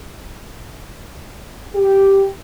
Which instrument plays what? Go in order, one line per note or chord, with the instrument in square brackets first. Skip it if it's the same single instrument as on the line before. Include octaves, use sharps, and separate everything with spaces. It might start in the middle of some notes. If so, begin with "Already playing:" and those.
[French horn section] G4